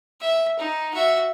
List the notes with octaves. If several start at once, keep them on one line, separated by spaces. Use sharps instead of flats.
E5
D#4
F#4 E5